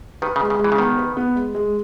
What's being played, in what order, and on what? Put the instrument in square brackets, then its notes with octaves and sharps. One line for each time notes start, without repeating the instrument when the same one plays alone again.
[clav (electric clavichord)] D#3 [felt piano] B4
[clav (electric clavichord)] C#3
[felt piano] G#3
[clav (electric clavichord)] C#3
[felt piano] G#3
[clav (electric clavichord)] E3
C#3
[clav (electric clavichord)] D#3 [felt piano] B3
[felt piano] B4
B3
G#3
G#3